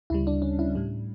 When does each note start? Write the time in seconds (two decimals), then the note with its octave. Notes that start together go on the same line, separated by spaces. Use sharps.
0.10 D2 C#3 G3 E4
0.27 D4
0.42 C#4
0.59 E4
0.75 A2 G3